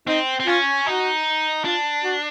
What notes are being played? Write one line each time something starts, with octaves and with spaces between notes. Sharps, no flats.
C4 D#4
C4
C#4 F4
D#4 F#4
D4 F4
F#4